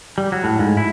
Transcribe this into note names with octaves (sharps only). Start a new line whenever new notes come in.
G3
F#3
A2
G#2
E4